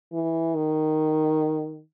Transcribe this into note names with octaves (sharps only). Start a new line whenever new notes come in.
E3
D#3